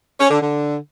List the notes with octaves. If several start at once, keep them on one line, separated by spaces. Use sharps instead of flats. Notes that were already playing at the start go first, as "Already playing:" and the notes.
C#4
D3
D3